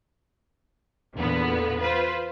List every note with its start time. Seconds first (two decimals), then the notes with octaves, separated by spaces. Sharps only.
1.15 E2 A#2 D3 B3
1.81 F4 B4 C5